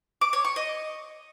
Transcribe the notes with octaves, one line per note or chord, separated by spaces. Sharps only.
D6
C#5
C#6
D#5